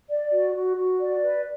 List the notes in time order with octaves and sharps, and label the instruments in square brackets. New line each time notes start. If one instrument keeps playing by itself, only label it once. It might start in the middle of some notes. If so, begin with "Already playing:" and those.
[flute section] D5
F#4
F#4
F#4
D5
B4